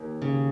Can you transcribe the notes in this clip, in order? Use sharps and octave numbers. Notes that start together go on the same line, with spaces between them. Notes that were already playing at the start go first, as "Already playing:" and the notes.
Already playing: D#2
C#3